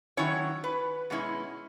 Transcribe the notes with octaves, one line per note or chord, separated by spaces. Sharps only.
D#3 F#3 C#4 E4 C#5
B4
B2 G#3 C#4 E4